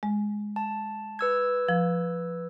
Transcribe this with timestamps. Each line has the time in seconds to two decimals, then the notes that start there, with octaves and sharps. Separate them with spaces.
0.03 G#3
0.56 A5
1.19 B4 E6 G#6
1.69 F3